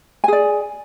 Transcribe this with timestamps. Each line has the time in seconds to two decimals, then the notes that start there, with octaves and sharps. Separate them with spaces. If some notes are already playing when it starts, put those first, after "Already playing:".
0.24 G#5
0.28 G#4
0.33 D5